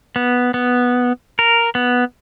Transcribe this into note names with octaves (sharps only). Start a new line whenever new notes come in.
B3
B3
A#4
B3